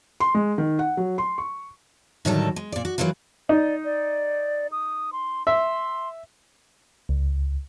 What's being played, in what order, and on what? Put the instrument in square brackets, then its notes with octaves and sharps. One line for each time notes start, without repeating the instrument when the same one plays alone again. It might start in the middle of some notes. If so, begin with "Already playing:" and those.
[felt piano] C6
G#3
D#3
F#5
F#3
C6
C#6
[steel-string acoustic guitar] A2 D3 D#3 F#3 G3 A4
G#3
A#2 D5
F#4
E3 F#3 A#3 F4 B4
[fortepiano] D#4 [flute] D5
[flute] D5
D#6
C6
[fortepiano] E5 [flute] C6
[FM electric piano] C#2